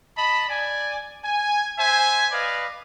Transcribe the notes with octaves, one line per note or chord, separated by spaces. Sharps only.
D#5 A5 B5
D5 G#5
G#5
C5 E5 G#5
B4 D5 D#5 F5